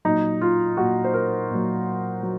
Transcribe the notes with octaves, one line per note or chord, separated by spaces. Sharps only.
A#2 F#3 D#4
F4
A#2 F#3 F#4
C5
A#4
A#2 F#3
F#3